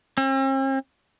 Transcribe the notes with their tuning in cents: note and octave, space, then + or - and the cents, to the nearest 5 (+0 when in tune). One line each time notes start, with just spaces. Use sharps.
C4 +45